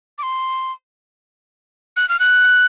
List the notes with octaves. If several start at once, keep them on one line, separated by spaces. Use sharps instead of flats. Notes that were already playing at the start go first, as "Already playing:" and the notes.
D6
C6
F#6
F6
F#6